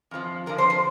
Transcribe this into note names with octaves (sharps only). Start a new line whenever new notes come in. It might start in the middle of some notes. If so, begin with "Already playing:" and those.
F2 D3 F3
F2 D3 F3 A#4
C5
C5